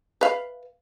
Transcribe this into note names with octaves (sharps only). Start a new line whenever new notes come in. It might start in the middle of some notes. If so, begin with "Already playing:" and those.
B4 F5